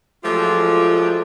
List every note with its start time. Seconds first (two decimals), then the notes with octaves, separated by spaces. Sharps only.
0.24 F3 F#3 G#3 A3 F4 G4